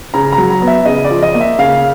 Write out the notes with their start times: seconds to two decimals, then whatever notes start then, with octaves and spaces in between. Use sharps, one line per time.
0.14 C#3 A#5
0.32 A#5
0.38 F#3
0.50 A#5
0.62 B3
0.68 E5
0.86 C#3 D#5
1.05 D5
1.10 F3
1.23 D#5
1.35 A#3
1.41 E5
1.59 C#3 F5